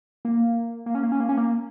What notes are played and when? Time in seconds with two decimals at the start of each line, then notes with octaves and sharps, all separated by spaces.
0.25 A#3
0.86 A#3
0.95 C#4
1.03 A#3
1.12 C#4
1.20 A#3
1.29 C#4
1.37 A#3